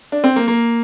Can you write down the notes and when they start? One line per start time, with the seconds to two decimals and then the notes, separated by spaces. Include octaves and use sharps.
0.12 D4
0.24 C4
0.36 A#3
0.48 A#3